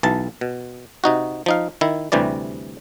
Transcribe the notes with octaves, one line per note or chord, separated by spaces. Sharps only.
B1 E3 A5
B2
C3 D#4 F#4
F3 D#4 F5
D#3 E4
D2 C3 E3 G3 D5